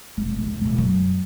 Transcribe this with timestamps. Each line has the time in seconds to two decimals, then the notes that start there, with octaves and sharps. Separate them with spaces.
0.17 F1 C3
0.36 A#1 D#2
0.61 E1 A#2
0.78 F#2